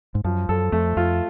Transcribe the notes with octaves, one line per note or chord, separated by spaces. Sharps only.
G#2
F#2 F3
F#2 A4
F2 A3
F2 F4